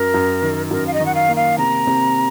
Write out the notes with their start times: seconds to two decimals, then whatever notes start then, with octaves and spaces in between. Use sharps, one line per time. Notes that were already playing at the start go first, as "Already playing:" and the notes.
Already playing: F#2 A#4
0.14 F#2
0.42 D#3
0.71 F#2 A#4
0.87 F5
0.94 D#5
1.00 D#3
1.06 F#5
1.15 F5
1.29 A#3
1.36 F5
1.58 C3 A#5
1.87 C3